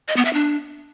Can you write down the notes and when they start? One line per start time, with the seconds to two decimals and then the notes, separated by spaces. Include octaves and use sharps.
0.08 D#5
0.17 B3
0.25 E5
0.33 D4